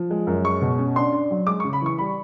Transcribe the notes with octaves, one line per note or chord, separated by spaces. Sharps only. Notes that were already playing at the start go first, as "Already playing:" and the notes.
Already playing: F3
G#3
F#2
G#3 C#6
B2
C#4
D4 C6
D4
F#3
G#3 D6
C#6
C#3
B5
E3 C#6
G3 B5